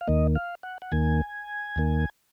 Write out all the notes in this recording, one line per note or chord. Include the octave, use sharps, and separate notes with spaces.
F5
D#2 D#3 A#3 D#5
F5
F#5
F#5
D#2 D#3 A#3 G#5
D#2 D#3 A#3